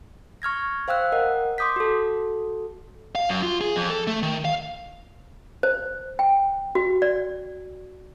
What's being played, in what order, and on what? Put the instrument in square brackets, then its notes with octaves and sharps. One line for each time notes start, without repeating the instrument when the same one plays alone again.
[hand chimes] C#6 F6 G#6 A#6
C5 F5 G5 E6 F#6
A#4 D#5 F#5
C6 D6 D#6 G6 B6
F#4 A4
[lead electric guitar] F5
F#2
F4
G#4
F2
A4
A3
D#3
F5
[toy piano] C5
G5
F#4
D5